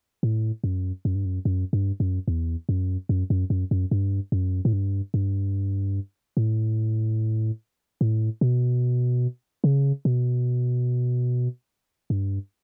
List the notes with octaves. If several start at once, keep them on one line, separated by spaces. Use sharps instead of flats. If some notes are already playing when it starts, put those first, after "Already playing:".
A2
F#2
F#2
G2
F#2
F#2
G2
F#2
E2
F#2
F#2
F#2
F#2
F#2
G2
F#2
A2
G2
G2
A2
A2
B2
C#3
B2
G2